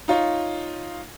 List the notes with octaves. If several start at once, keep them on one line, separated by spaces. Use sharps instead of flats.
D#4 F4 C#5